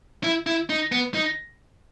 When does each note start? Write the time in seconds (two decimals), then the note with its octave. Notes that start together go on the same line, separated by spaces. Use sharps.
0.24 E4
0.47 E4
0.70 D#4
0.92 B3
1.14 D#4